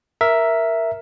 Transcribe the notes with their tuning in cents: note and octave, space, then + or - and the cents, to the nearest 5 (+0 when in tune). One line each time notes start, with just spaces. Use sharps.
A#4 +0 E5 +0